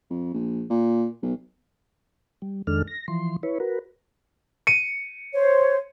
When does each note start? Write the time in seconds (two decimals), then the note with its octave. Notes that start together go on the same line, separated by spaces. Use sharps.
0.10 F2
0.34 A#1
0.70 A#2
1.22 B1
2.42 G3
2.67 F2 D#3 G#3 D4 A4 F6
2.87 A#6
3.08 E3 F3 C6
3.43 E4 B4 C#5
3.60 F#4 A#4 B4
4.67 C#7 D#7
5.34 C5 C#5